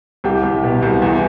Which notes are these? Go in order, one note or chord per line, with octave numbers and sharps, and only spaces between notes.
C2 G4
C2
B2
C2
E2